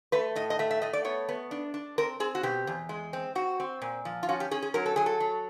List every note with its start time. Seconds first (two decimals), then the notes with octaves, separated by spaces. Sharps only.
0.12 A3 B4
0.36 A2 D#5
0.50 D#5
0.59 A3 E5
0.71 E5
0.82 A3 D#5
0.93 D5
1.05 B3 C#5
1.29 B3
1.51 D4
1.74 D4
1.98 C4 A#4
2.20 C4 G#4
2.35 F#4
2.43 B2 G4
2.67 E2
2.89 G#3
3.13 C4
3.35 C4 F#4
3.60 C4
3.82 A#2
4.05 F3
4.23 F4
4.29 C#4 F#4
4.40 G4
4.51 C#4 G#4
4.63 G#4
4.74 F#3 A#4
4.86 A4
4.96 F#3 G#4
5.06 A4
5.20 F#3